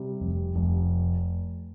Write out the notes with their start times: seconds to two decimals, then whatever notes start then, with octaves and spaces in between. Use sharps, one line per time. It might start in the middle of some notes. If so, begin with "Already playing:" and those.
Already playing: C3 G3
0.20 F1
0.55 F1